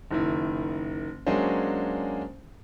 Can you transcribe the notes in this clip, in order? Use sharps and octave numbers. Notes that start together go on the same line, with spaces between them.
F#1 D#3 E4
F#3 G#3 A#3 C#4 D4 C5